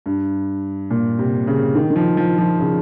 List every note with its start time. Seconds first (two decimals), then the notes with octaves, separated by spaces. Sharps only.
0.06 G2
0.91 A#2
1.19 C3
1.47 C#3
1.75 D#3
1.90 D#3
1.96 F3
2.17 F3
2.38 F3
2.59 C#3